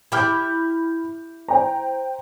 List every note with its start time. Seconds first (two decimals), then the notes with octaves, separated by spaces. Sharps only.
0.12 E4 G4 B5 F6 G6
1.48 C5 G5 A#5